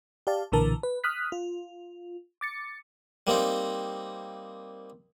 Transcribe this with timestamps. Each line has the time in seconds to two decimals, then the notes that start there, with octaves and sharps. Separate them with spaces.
0.27 G4 D5 F5 A5
0.52 B1 A#2 D3 E3 A#4 A5
0.83 B4
1.04 D#6 F6 F#6 B6
1.32 F4
2.41 D6 A6 C#7
3.27 G3 A#3 C4 D#4